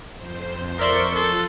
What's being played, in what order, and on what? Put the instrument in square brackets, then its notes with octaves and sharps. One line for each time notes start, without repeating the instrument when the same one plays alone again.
[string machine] F2 C5
[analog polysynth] A#4 D5 C#6 [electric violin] E5 C6
[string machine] F3 F4 F#6 [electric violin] A4 C6